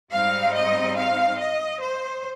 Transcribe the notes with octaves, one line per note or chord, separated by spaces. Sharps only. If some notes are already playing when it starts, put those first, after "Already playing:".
G#2 G3 C4 D#4 F5
D#5
F5
D#5
C5